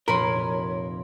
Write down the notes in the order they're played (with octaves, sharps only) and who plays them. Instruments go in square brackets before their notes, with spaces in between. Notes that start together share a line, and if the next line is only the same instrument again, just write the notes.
[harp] F1 A#2 [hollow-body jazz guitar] A#4 [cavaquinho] B4 B5 C6 [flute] C#5